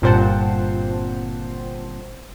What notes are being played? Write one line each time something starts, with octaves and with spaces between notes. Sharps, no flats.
G1 A#2 C4 C5 F#5 A5